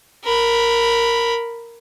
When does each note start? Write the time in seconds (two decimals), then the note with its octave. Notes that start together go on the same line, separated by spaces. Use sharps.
0.24 A#4 B5